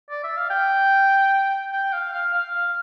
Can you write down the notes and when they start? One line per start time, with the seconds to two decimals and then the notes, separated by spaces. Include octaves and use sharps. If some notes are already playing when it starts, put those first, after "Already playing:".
0.11 D5
0.24 E5
0.37 F5
0.50 G5
1.73 G5
1.93 F5
2.14 F5
2.34 F5
2.55 F5